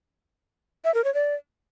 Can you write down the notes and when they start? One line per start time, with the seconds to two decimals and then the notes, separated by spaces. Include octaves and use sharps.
0.85 E5
0.94 A#4
1.04 C#5
1.14 D5